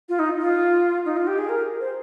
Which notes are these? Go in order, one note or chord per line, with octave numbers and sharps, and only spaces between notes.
F4
D#4
F4
D#4
F4
G4
G#4
A#4
C5